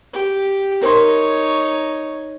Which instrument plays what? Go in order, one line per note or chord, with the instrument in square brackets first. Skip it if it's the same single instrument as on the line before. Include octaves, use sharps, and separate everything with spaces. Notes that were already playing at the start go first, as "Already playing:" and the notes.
[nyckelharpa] G4
[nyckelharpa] D#4 C#5 [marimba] A#4 C5 C6